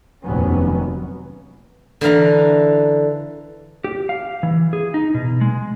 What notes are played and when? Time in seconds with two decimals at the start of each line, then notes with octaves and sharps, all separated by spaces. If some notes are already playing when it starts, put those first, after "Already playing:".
0.23 F1 D#2 C3 F#3 B3 C#4
2.01 D3 E3 F5 A#5
3.84 G4
4.09 F5
4.43 E3
4.73 G#4
4.94 D#4
5.14 B2
5.41 G#3